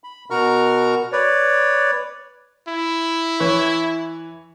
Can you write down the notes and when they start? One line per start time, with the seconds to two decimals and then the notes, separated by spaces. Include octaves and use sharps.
0.04 B5
0.30 B2 F#4 A#4 A#5 C#6 F6
1.12 B4 C#5 D5
2.68 E4
3.40 E3 B4 C#5